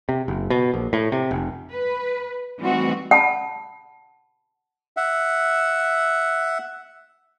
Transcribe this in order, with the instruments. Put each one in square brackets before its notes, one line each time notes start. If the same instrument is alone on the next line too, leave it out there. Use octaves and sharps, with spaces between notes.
[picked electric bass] C3
F#1
B2
A#1
A2
C3
F1
[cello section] B4
E3 G3 A3 C4 D#4 F#4
[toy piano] F#5 A5 B5
[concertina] E5 F#5